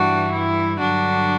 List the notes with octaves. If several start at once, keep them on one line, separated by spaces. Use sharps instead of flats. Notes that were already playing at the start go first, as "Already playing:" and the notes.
Already playing: G2 E3 G3 D4 F#4
E4
G2 D3 F#3 D4 F#4